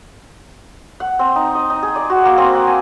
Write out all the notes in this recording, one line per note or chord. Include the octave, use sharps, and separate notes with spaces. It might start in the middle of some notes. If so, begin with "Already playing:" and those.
F#5
C4
D#4
D#5
D#4
G#4
D5
F#4
A#3
C4
F#5
G#5